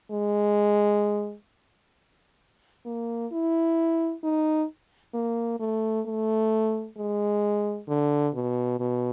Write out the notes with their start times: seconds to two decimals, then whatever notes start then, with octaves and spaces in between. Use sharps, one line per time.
0.11 G#3
2.86 A#3
3.32 E4
4.23 D#4
5.14 A#3
5.60 A3
6.06 A3
6.98 G#3
7.88 D3
8.35 B2
8.80 B2